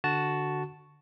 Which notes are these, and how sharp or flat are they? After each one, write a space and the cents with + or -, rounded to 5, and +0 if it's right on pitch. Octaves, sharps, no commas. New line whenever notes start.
D3 +0 F#4 +0 A5 -5